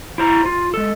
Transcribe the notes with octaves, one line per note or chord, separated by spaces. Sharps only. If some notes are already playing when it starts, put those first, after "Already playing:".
E4 C5 A#5
F4
G#3 A4